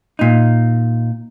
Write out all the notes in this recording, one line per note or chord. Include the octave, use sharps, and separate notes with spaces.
A#2 D#4